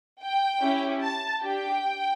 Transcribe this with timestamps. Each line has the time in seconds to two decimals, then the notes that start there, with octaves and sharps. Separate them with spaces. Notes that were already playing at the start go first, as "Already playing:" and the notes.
0.22 G5
0.62 C#4 E4 G4
1.03 A5
1.44 D4 G4 G5